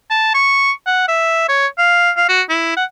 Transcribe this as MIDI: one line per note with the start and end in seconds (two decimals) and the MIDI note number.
0.10 0.29 81
0.34 0.71 85
0.86 1.03 78
1.08 1.47 76
1.49 1.67 73
1.78 2.11 77
2.16 2.25 77
2.29 2.42 66
2.49 2.75 64
2.76 2.84 78